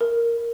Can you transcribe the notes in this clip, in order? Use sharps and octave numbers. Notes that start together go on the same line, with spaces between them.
A#4